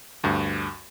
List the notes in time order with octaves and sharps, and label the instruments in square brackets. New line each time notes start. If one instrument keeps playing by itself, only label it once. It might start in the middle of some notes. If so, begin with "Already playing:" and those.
[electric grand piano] D2 G2